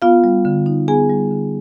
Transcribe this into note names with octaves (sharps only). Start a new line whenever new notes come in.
B3 F4 F5
G3
D3
D#4
B3 G#4 G#5
G3
D3